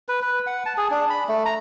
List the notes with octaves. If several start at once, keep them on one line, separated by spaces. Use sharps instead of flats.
B4
B4
F#5
A5
G#4
D4
B5
A3
A#5